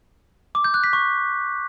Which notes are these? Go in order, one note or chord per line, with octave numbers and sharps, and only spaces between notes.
D6
G6
F#6
B6
C#6